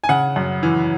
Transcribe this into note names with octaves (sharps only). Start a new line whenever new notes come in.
G#5
C#3 F#5
F#2
E3